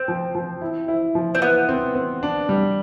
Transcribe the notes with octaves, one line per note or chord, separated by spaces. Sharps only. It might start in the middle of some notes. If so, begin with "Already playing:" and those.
Already playing: C4 C5
F3
F3
E4
E4
F3
C4
B3 E4
C4
C4
D4
G3